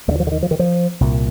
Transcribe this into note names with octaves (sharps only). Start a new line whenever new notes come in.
D#2 D3 G3
F3
D3
D#3
F3
D#3
F3
C2 A#2